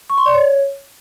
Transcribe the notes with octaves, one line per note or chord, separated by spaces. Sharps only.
C#6
C6
D5
C#5